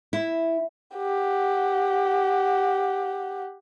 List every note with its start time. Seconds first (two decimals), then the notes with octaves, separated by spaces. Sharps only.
0.13 E4
0.97 G4 F#5